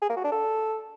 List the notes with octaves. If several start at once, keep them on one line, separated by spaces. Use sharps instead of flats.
G#4
A#3
F#4
D4
A4